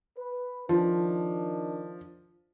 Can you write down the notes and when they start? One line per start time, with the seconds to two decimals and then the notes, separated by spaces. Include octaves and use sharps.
0.17 B4
0.69 D#3 F3 D4